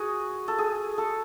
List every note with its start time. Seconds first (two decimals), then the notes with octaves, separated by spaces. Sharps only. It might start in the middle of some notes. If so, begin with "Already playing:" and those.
Already playing: F#4 G#4
0.48 A4
0.58 G#4
0.98 A4